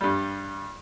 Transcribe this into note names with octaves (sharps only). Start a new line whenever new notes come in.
G2 G3